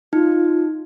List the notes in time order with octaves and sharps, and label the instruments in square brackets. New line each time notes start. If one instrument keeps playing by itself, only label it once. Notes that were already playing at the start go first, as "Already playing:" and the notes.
[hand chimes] D#4 [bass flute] F4